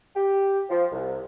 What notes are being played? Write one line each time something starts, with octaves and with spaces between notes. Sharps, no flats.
G4
F3
C2